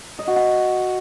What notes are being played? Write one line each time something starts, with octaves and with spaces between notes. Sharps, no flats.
D#5
F#4
F#5